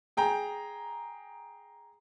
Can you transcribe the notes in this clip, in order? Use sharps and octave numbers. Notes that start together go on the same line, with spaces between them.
G#4 G5 A#5